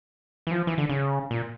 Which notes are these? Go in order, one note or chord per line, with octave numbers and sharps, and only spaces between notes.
E3
F3
E3
D3
C#3
A#2